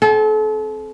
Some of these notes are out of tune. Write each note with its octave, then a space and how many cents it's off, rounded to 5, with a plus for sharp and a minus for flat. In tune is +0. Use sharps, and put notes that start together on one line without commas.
C4 +0 A4 -35